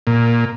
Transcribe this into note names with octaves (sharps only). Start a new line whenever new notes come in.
A#2